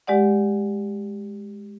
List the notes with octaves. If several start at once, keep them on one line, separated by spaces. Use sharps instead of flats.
G#3 G4 D5 F#5